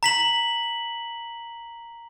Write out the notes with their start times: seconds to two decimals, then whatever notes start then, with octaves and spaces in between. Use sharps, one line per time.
0.03 A#5 B6 F#7